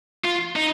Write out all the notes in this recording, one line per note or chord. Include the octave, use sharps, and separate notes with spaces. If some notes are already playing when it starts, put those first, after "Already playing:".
F4
D#4